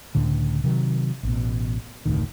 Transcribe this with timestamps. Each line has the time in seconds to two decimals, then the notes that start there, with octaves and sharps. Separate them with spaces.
0.15 C#2 A2 D3
0.64 C3 D#3 F#3
1.23 A1 B2
2.06 F1 D2 A2 D#3